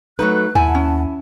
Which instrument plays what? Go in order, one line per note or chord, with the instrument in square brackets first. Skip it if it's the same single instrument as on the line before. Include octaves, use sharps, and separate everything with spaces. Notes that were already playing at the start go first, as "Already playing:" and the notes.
[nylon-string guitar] F#3 A3 B4 [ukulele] D#4 F#4 [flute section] F#6
[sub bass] D#2 [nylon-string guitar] E4 [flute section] F#5 A5 [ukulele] G#5
[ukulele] C#4